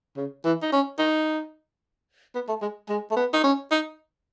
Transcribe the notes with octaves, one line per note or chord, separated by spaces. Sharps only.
C#3
E3
D#4
C#4
D#4
B3
A3
G#3
G#3
A3
B3
D#4
C#4
D#4